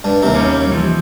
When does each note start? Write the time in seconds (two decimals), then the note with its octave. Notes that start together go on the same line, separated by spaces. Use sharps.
0.04 G2
0.22 D#2 C3
0.35 G3 A#3 C#4
0.72 E3 F3